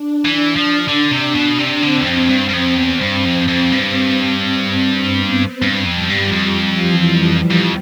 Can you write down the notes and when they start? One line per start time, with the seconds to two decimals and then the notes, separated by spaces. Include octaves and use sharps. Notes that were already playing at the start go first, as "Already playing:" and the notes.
Already playing: D4
0.25 E3
0.56 F3
0.88 D3
1.12 C3
1.35 B2
1.59 C3
1.82 D3 C4
1.99 E2
2.06 F2
2.29 G2
2.49 G2
2.53 F2
2.77 E2
3.01 G2
3.25 F2
3.48 F2
3.72 G2 C4
4.19 C4
5.14 B3
5.62 G2
5.85 F2
5.93 G3
6.10 G2
6.25 F3
6.32 F2
6.88 E3
7.20 E3
7.51 F2 F3